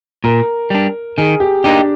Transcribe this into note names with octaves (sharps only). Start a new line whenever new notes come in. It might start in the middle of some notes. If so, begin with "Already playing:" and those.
A#2 A#4
G3 D4
D#3 G#4
G4
A#3 D4 D#4 G4